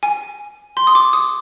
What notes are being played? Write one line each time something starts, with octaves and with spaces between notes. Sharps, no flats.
G#5
C6
D#6
D6
D#6